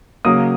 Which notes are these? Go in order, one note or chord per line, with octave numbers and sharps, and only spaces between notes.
C#3 F#3 A#3 D#6